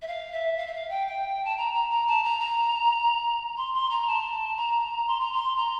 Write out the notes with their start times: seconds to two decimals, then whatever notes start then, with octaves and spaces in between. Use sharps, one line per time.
0.01 E5
0.07 F5
0.32 E5
0.57 F5
0.67 E5
0.73 F5
0.89 G5
1.07 G5
1.44 A5
1.57 A#5
1.73 A#5
1.89 A#5
2.07 A5
2.23 A#5
2.40 A#5
3.57 C6
3.73 C6
3.90 A#5
4.07 A5
4.56 A#5
5.07 C6
5.20 A#5
5.32 C6
5.56 A#5